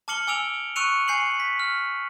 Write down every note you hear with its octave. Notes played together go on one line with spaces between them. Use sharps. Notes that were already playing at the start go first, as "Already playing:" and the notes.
A5 D6 F6 C#7 F#7 G7
G#5 D6 E6 D7 F7
C#6 E6 F#6 C#7 D#7 F7
G#5 G6 C7 C#7 F#7
B6
F6